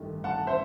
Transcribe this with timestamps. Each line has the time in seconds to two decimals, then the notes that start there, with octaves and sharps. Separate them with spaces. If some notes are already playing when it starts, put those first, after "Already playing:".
Already playing: A1 G2 D#3 A3
0.24 F#5 A5
0.47 C5 E5